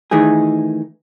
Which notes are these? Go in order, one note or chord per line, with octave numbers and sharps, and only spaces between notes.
D#3 E3 A3 D#4 G#4